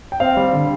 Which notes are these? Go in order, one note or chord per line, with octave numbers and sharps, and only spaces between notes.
G5
C4 F5
G3
D3